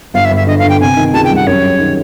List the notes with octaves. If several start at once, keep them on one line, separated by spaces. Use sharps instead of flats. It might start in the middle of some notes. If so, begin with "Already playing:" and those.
G1 F5
E5
G1
E5
D3 D#5
F5
D3
G5
C3 G#5
D#3
C#2 A5
G5
G3
F#5
F#2 C#5
F#2
D#3